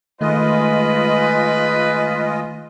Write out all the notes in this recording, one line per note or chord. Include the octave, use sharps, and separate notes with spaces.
D#3 G#3 A3 F4 B4 D#5